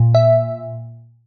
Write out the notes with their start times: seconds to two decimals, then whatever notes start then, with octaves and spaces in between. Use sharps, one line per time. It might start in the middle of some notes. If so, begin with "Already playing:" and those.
Already playing: A#2
0.15 E5